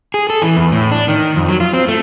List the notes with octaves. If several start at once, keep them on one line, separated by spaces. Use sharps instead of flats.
G#4
A4
E3
E2
A2
D4
D#3
F2
F#3
F4
C4
A3